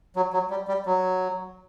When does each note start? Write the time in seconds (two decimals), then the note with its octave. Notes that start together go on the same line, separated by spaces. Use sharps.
0.16 F#3
0.33 F#3
0.50 G3
0.68 G3
0.86 F#3